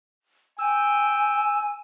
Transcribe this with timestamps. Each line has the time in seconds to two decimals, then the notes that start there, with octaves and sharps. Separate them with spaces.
0.59 G5 G#5 E6